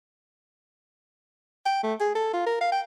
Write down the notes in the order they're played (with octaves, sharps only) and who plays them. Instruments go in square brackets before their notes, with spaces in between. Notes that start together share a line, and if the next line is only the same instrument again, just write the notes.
[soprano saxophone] G5
A3
G#4
A4
F4
A#4
F5
G5